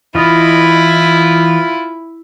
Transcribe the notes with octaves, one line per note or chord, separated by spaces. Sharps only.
E3 E4 F4 D#5